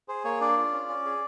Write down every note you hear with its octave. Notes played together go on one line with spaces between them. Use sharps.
G#4 C5
A#3 C#5
D4 D5
F4
C#4
C#4
G#4